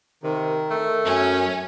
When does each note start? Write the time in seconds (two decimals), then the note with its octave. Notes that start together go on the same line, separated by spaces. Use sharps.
0.23 C3 D#3 A#4
0.71 A3
1.05 F#2 C#4